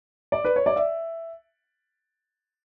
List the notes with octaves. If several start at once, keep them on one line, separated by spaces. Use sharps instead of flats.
D5
B4
C#5
D5
E5